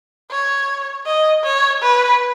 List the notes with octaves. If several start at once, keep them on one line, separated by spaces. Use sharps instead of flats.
C#5
D#5
C#5
B4